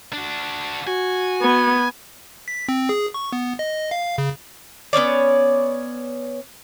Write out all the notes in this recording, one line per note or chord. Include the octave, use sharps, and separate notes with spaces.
D4 F#4
F#4 G#5
B3
B6
C4
G#4
C#6
B3
D#5
F5
C#3
B3 C#4 C#5 D5